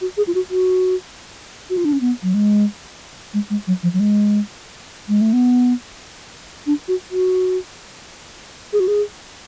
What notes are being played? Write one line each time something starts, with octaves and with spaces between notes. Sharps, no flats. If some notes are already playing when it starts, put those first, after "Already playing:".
F#4
G#4
F4
F#4
F#4
F#4
F4
D4
C#4
B3
F#3
G#3
G#3
G#3
F#3
F3
F#3
G#3
G#3
A3
B3
D4
F#4
F#4
G#4
F#4
G#4